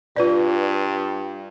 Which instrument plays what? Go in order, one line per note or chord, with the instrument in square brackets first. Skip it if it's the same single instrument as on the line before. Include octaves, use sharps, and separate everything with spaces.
[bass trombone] G2 [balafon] F4 B4 D5